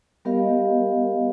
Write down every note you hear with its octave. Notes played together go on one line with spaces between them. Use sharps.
G3 B3 G4 A#4 D#5 F5